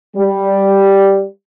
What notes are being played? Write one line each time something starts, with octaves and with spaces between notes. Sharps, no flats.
G3